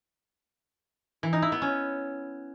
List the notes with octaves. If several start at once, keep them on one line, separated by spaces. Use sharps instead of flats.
E3
D#4
E4
B3
C#4